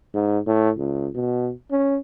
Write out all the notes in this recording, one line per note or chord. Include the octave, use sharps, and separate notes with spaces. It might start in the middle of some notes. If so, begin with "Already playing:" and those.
G#2
A2
C#2
B2
C#4